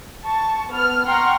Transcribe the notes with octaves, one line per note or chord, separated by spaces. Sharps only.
A5 C#6
B3 F6
F#5 G5 A#5 C6 C#6 F6